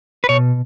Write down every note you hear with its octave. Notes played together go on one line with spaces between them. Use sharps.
B4
B2 C#5